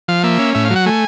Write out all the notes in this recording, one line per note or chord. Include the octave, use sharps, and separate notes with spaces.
F3 F5
A#3 E5
C#4
A2 E5
F5
F#3
F#5
A3 G#5